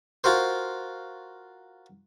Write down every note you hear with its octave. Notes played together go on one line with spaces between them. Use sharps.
F4 F#4 A#4 C5